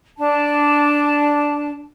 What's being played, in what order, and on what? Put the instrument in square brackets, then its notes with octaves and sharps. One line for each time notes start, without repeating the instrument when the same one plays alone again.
[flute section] D4 A5